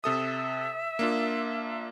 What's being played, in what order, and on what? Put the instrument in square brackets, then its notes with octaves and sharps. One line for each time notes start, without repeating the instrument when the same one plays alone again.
[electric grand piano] C3 A4 D#6 [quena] E5
[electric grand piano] A#3 D4 F4